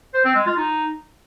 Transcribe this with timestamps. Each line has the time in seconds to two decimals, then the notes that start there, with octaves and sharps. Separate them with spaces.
0.14 C5
0.25 C4
0.36 G#3
0.46 F4
0.57 D#4